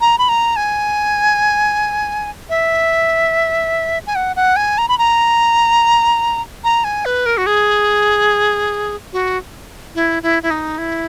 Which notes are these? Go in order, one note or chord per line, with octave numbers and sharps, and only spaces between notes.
A#5
B5
A#5
G#5
E5
G#5
F#5
F#5
G#5
A#5
B5
A#5
A#5
G#5
B4
A#4
F#4
G#4
F#4
E4
E4
E4
D#4
E4